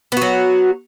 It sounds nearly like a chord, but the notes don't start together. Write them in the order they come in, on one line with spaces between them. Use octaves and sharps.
B3 F#4 F#3